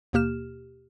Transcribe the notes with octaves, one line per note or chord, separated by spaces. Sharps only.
D#2 B2 A#3 G4 F6 E7